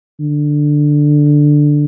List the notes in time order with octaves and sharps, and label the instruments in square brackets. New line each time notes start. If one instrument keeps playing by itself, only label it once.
[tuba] D3